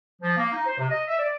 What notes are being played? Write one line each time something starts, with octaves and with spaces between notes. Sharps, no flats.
F3
A#3
D#4
C5
C3
D#5
E5
D5